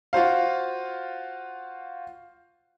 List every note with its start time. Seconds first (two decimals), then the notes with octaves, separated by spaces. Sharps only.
0.13 F4 F#4 C5 F5